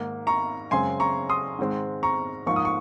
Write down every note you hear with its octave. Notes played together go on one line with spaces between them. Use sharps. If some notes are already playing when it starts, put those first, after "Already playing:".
Already playing: G#2 D#3 A#3
A#5 C#6
F#2 C#3 G#3 C4 G#5 C6
A#5 C#6
C6 D#6
G#2 D#3 G#3 C4
A#5 C#6
G#2 F3 A#3 C#6
D#6
C#6